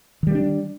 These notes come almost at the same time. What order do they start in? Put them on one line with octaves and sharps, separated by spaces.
D#3 G3 A#3 D4